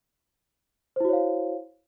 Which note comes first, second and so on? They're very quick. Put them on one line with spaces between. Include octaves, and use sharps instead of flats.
C5 E4 F#4 C#5 F5